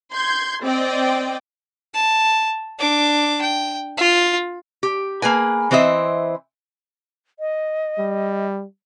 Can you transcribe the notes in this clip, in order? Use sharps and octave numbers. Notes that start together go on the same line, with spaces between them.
C6 G6 G#6
C4 D5 D#5 G5
A5
D4 D6
G5
F4
G4
A#3 G#4 B4 G#5
E3 C4 C5 D#5 E5
D#5
G3